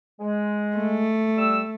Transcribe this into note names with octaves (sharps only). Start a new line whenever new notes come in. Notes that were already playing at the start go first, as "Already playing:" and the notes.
G#3
A3
G3 E6